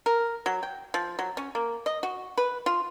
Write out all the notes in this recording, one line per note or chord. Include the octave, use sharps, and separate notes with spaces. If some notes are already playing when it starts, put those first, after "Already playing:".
A#4
F#3
G5
F3
F#3
C#4
A#3
D#5
F#4
B4
F4